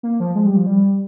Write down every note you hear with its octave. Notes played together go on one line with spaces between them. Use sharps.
A#3
F3
G#3
G3
F3
G3